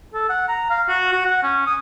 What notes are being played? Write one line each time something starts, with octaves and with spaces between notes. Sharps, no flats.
A4
F#5
A#5
F5
F#4
F#4
F#5
C#4
D#6